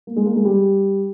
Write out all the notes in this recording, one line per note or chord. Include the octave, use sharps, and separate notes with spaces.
A#3
G#3
A#3
G#3
G3